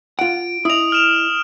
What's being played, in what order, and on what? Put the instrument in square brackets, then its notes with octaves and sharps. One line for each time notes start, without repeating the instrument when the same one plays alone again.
[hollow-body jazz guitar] F4 F#5 [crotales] D7
[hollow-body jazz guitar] E4 D#5 [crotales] D#6 F7
[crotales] F6 E7 F7